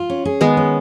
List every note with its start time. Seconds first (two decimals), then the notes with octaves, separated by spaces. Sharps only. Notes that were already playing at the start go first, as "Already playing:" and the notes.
Already playing: F4
0.10 C#4
0.25 G#4
0.41 D#3 G#3 B3
0.57 C#4